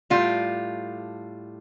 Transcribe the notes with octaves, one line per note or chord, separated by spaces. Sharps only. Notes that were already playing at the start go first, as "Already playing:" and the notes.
A2 G3 F4